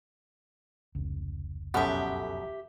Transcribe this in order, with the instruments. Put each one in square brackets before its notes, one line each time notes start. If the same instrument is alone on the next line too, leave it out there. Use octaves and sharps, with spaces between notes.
[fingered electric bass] F1 C#2
[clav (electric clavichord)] F#2 B2 F3 [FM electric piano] C#4 A4 F#5 [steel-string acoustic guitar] G4 E5